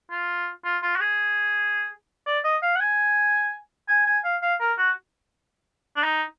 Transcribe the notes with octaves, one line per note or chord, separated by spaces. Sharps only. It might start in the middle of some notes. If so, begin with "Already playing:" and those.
F4
F4
F4
F#4
G#4
D5
D#5
F5
F#5
G#5
G#5
G#5
F5
F5
A#4
F#4
D4
D#4